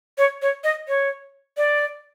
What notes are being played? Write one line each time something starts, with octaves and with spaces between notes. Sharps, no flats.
C#5
C#5
D#5
C#5
D5